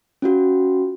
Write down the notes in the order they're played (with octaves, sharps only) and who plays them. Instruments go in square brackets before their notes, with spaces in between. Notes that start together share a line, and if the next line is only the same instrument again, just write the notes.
[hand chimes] C#4 F4 F#4